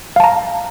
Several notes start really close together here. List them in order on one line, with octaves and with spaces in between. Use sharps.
F5 A5 A#5